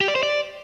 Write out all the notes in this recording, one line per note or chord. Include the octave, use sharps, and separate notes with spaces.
G4
D5
C5
D5